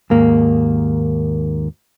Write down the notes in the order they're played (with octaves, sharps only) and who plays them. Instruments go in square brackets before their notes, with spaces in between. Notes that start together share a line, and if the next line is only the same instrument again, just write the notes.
[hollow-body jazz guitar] D#2 G#2 A#3